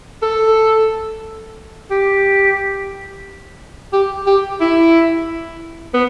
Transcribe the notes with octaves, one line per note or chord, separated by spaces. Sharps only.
A4
G4
G4
G4
E4
B3